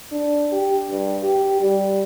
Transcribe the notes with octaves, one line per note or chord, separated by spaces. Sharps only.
D4
G4
G2
G4
G3